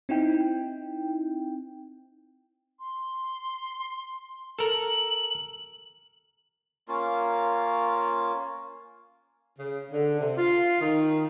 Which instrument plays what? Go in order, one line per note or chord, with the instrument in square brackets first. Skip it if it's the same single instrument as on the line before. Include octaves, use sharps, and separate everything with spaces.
[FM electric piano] C4 D#4 E4 G5
[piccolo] C6
[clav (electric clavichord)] A4 A#4 [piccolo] F#7
[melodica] A#3 C#4 F4
[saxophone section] C#3
D3
C3
F4
D#3